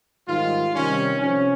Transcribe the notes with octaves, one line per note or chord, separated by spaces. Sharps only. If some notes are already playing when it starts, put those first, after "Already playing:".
G#2 D#3 G3 F4
C3 D#3 G3 C#4
C3 F3 C#4